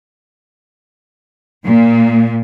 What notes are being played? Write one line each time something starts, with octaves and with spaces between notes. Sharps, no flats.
A#2